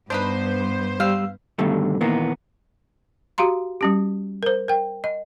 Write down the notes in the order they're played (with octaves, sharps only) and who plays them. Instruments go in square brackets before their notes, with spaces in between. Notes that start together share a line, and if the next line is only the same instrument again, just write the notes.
[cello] G2 B3 [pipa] D4 D#4 B4 [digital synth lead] C5
[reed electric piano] G3 E6 [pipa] F5
[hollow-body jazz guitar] G2 B2 D3 D#3 G3 A3
A#2 D#3 E3 A#3 B3
[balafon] F#4 G4 F5 A#5 C6
G3 C#4 G4
A#4 C5
A#4 G5
D#5